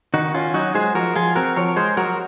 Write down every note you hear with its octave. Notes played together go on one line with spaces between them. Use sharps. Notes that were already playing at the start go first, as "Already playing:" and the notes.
D#3 D#4 F#4
C#4 F4
F#3 D#4 F#4
G#3 G#4 C5
F3 F#4 A#4
F3 F4 G#4
C4 F#4 A#4
F3 A#4 C#5
G#3 G#4 C5
F#3 F#4 A#4